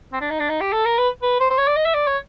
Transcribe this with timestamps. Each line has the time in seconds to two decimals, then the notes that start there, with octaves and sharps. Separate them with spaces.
0.13 C4
0.21 D4
0.30 D#4
0.40 D4
0.49 D#4
0.61 G4
0.73 A4
0.85 A#4
0.98 B4
1.22 B4
1.40 C5
1.50 C5
1.58 C#5
1.67 D5
1.76 D#5
1.85 E5
1.94 D5
2.07 C#5